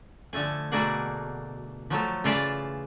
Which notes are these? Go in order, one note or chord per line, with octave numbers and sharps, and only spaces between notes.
D3 F3 A3 G#5
B2 A3 A#3 D4 G#4 F#5
F3 F#3 A3
C#3 E3 F4 D5 E5 A5